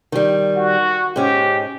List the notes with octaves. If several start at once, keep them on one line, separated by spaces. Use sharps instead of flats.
D#3 G3
F#4
G#2 C#4 G4